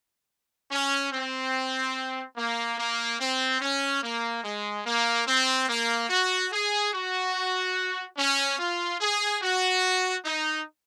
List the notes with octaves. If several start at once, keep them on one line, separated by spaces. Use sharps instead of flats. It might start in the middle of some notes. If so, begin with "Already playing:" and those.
C#4
C4
A#3
A#3
C4
C#4
A#3
G#3
A#3
C4
A#3
F#4
G#4
F#4
C#4
F4
G#4
F#4
D#4